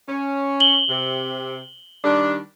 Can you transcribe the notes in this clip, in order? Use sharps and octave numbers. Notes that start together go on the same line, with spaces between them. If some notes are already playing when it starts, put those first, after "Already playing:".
C#4
F#7 G7
C3
D#3 G3 D4